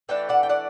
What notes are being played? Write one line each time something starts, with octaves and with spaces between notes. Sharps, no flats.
E3 A3 D4 G5
D5 F#5
G5
D5 F#5